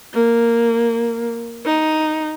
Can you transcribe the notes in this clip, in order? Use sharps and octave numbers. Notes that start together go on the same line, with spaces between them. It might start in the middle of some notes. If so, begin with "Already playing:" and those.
A#3
D#4